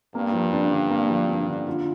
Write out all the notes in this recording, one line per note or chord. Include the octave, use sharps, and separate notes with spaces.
G2 A#3
F3
D4
D3
A#3
F3
D4
D3
F4